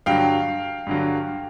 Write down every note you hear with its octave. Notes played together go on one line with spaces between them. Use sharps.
G2 D3 F#3 F5 G5
G2 D3 F#3